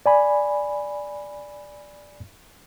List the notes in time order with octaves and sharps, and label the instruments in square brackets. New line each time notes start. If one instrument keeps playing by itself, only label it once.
[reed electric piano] D5 G#5 B5